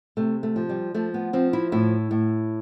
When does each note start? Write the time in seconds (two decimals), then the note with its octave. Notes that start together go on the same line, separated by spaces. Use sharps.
0.17 C3 A3
0.43 A3
0.56 F3
0.69 G3
0.94 F3 A3
1.14 B3
1.33 F3 C4
1.53 E4
1.72 A2 E4
2.11 A2